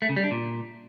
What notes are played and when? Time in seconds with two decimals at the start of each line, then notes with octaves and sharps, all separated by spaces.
0.02 A3
0.09 C#3
0.16 G3
0.24 D4
0.31 A#2